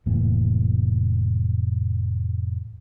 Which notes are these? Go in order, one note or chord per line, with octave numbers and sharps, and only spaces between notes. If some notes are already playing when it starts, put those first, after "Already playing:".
F1 A2 E3 A#3